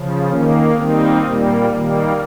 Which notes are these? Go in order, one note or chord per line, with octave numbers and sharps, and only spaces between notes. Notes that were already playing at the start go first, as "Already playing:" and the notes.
Already playing: C#3 F3
D#3 A#3 C#4
D#3 G3 A#3 C4 D#4
A#2 G3 A#3
D#3 G3 A#3